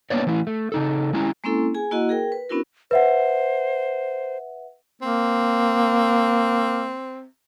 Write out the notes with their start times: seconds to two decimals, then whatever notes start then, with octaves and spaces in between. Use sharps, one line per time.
0.10 A#3 B3 D4 B4 C#5 D5
0.27 E3 A3 E4
0.47 A3
0.72 C#3 D#4 A4
1.13 G#3 C#4 E4 A#5
1.44 G#3 A#3 C4 C#4 E4 A4
1.75 G#4 G#5
1.91 A#3 E4 F#4 D#5 F#5
2.09 G#4 A#4 G5
2.32 B4
2.49 B3 C#4 D4 E4 F#4 A#4
2.91 B4 C5 E5 F#5
5.02 A#3 C4